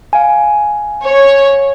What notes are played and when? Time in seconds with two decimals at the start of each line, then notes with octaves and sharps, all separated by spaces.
0.13 F5 G#5
1.05 C#5